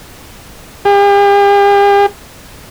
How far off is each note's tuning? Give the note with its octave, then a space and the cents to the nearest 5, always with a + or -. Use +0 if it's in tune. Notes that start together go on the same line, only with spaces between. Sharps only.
G4 +45